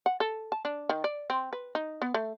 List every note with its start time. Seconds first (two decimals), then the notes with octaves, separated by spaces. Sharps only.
0.06 F#5
0.20 A4
0.52 A5
0.65 D4
0.89 D#3
1.04 D5
1.30 C4
1.53 B4
1.75 D#4
2.02 B3
2.14 A3